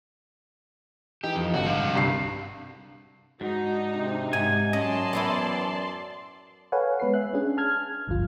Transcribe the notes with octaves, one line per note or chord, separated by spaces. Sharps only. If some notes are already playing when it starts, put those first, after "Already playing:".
E3 D#4 G4
F2
G#1 D3 F#4
C3 G3 F5
C2 G2 C7
G#2 D4 D#4 F#4
C3
G#2 G#5
F#2 C#4 D5 D#5 A5 C6
E3 B3 E4
A4 B4 C#5 F5 F#5 G#5
G#3 B3 B4 C#5 C7
E5 F#6
C#4 D4 G#4
A5 F6 G#6
G#1 D2 G2 D3 F3 F4